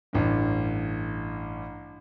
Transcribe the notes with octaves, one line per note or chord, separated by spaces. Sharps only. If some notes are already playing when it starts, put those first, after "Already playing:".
A1 G2